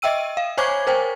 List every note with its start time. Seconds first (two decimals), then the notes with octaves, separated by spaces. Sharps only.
0.02 D#5 E5 G5 E6 D#7
0.37 F5
0.58 C5 C#5 G#5 C#6 D6 G#6
0.87 A#4 C5 G5 G#5